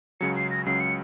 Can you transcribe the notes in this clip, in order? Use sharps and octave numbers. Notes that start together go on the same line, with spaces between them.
C#2 C#3 F#3 C#7
C7
A#6
C#2 C#3 F#3 C7
C#7